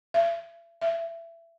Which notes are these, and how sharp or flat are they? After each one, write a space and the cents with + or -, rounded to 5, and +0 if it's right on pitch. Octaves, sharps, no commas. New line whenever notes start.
E5 +40
E5 +20